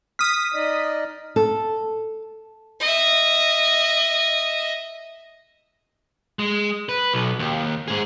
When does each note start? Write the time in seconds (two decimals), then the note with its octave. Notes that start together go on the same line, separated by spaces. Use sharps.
0.19 D#6 F6 B6
0.54 D#4 D5 D#5
1.36 A4
2.80 D#5 E5
6.39 G#3
6.89 B4
7.14 B1
7.39 D#2
7.88 G#2 G#4